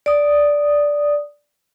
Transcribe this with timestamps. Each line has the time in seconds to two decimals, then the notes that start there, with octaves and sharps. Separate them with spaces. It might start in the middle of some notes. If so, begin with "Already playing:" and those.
0.06 D5 D#6